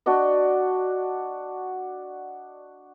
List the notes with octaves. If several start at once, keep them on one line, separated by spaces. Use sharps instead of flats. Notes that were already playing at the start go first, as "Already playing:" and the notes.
D4 F#4 D5 D#5